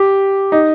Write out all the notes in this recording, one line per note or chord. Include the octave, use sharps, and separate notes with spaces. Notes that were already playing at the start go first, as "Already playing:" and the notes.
Already playing: G4
D#4